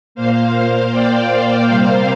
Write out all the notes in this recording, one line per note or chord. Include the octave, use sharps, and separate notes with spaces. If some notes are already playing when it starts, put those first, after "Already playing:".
A#2 A#3 C5 F5
C5 F5
D5 G5
C3 G3 A#3 C5 F5